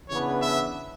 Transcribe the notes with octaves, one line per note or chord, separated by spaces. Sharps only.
C#3 E3 B3 D4 C#5
E5